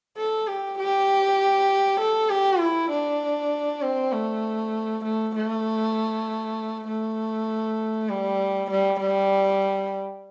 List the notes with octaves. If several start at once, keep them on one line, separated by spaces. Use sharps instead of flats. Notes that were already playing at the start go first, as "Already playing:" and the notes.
A4
G4
G4
A4
G4
E4
D4
C4
A3
A3
A3
A3
G3
G3
G3